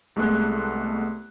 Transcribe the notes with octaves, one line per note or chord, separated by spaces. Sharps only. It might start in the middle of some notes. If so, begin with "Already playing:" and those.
C2 G#3 A3 B3 F#6